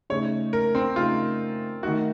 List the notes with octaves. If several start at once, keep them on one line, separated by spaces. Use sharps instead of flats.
C#3 A3 D#4 C#5
A#4
C4
C#3 A3 D#4 F4
D#3 A3 D#4 F#4